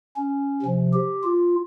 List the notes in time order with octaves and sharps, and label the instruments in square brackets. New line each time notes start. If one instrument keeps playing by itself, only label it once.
[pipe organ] C#4
C3 F3
G4
F4